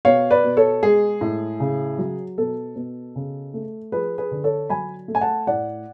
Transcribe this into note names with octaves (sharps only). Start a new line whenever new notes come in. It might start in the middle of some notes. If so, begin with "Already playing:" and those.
B2 C#5 F5
B4 D5
B2
A4 C#5
G#3 G#4
A2
C#3
F#3
B2 A4
B2
C#3
A3
F3 G#4 B4
G#4 B4
D3
A4 C#5
F#3 G#5 B5
A3
G#5
F#5 A5
A2 D5 F#5